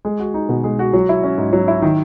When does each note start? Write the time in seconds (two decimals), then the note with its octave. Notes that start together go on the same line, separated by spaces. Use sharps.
0.05 G#3
0.20 F#4
0.34 D#4
0.49 B2
0.64 G#3
0.79 F#4
0.93 F#3
1.09 E4
1.23 C#4
1.38 G#2
1.53 F#3
1.68 E4
1.82 D#3